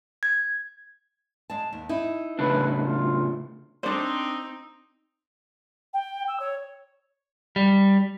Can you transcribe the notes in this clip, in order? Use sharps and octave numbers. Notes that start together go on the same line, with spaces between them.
G#6
G#3 A5
D#2
D#4 E4
A2 C#3 D4 B4
F4
C4 D4 D#4 C5
G5
E6
C#5
G3